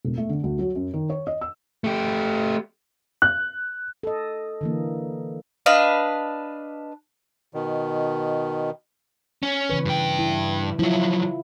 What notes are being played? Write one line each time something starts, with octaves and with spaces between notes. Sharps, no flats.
E1
A3
D3
D2
F#3
F#2
D#3
C#5
D#5
E6
A3 G4
F#6
A4 D#5
D3 E3 A#3
D4 B4 D#5 F5
B2 D#3
C#4
C#3 E3 B4
G2 G5
E4
F3 F#3 E4 F4